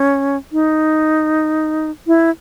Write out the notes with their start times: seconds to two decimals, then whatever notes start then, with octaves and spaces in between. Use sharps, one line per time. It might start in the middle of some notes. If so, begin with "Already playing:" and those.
Already playing: C#4
0.52 D#4
2.07 E4